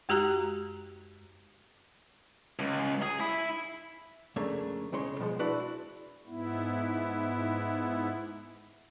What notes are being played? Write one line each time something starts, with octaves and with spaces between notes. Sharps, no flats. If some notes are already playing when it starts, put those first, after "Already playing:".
F#2 G#3 F#4 G4 A#5 F#6
C#2
G#4
E4
F2 C#3 A3 A#3 D4 C#5
B1 C#3 G#3 C#5 C6
B2 F3 F#3 G#3
D4 E4 F#4 B4 D5
G#2 B3 E4